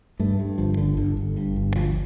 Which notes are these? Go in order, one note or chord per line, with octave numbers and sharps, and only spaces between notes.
G2 A3
G2
G1 F3
D3
G1 D3
G1
G2
G1
D2 F3